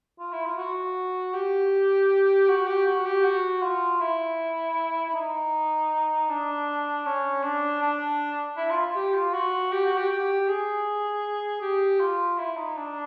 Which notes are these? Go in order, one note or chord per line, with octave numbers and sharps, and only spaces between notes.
F4
E4
F4
F#4
G4
F#4
G4
F#4
G4
F#4
F4
E4
E4
D#4
D4
C#4
D4
D4
E4
F4
G4
F4
F#4
G4
F#4
G4
G4
G#4
G4
F4
E4
D#4
D4